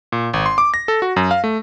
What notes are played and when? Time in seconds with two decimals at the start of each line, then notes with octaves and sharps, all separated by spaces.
0.12 A#2
0.34 G#1
0.46 C6
0.58 D6
0.74 A#6
0.88 A4
1.02 F#4
1.16 F#2
1.31 F5
1.44 A3